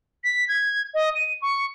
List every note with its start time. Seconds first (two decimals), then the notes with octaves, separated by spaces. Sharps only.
0.24 B6
0.48 G#6
0.94 D#5
1.15 D#7
1.42 C#6